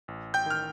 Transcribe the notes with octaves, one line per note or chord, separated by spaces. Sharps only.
A1
G5 G6
D#3 F6